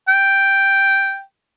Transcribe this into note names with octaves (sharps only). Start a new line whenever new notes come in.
G5